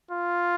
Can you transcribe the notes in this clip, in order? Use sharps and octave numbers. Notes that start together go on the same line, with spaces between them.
F4